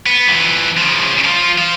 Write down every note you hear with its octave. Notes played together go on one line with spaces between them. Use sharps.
B3
F2 E3
C#3 F3
F3 F4
C5 F5